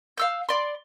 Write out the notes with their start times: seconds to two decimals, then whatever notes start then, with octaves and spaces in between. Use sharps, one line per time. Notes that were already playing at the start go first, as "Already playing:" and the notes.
0.18 F5 E6 G6
0.49 D5 C6